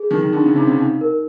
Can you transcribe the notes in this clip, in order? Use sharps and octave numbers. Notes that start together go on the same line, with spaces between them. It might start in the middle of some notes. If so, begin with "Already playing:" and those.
Already playing: G#4
D#3 D#4
D#3
D3 D#4
C#3
C3 D#4
C#3
D#4
A#4